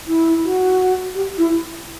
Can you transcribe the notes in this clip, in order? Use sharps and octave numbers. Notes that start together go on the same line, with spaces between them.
E4
F#4
G4
E4